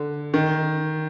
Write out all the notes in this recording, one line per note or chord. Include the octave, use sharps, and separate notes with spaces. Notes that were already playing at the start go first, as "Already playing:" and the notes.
Already playing: D3
D#3